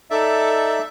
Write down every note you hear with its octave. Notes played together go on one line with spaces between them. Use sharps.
D#4 A4 D5 E5